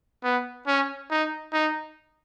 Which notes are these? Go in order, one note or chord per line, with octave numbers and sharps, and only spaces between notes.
B3
C#4
D#4
D#4